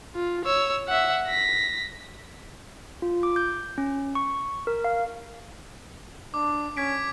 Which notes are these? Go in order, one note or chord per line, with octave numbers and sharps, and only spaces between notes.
F4
C#5 E6
E5 F#5
A#6 B6
F4
D6
G6
C#4
C#6
A#4
F5
D4 D6
C#4 G#6 B6 D7